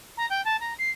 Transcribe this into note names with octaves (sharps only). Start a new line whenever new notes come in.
A#5
G5
A5
A#5
C7